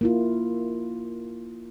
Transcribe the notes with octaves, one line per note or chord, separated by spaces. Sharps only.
A#3 E4 F4